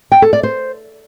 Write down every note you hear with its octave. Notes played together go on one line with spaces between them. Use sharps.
G5
A4
D5
C5